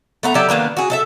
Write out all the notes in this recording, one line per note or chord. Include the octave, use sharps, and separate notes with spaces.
A3 B3 A#5
F#3 G4 D5 E5
D#3 A#3 B3 D4
F#4 G#4
A4 D#5 E5